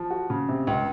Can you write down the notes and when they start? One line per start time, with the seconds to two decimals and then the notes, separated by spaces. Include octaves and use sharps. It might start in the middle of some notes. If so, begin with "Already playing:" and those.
Already playing: F3
0.10 F#4
0.30 C#3
0.49 C3
0.67 C#2